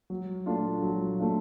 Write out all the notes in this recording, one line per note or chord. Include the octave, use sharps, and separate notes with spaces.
F#3
A3 D4 F4
F#3
A3 D4 F4